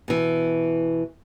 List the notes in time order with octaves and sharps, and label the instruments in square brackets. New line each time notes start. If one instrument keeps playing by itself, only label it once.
[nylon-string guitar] B2 E3